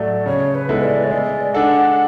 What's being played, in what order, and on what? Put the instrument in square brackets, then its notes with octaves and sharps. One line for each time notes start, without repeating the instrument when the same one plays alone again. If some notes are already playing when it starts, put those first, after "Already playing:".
Already playing: [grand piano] A2 F#3 A3 [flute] D5
[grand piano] C#3 [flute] C#5
[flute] B4
[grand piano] G#3 B3 E4 A4
[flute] D5
C#5
[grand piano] G#3 [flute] D5
[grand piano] D4 A4 [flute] F#5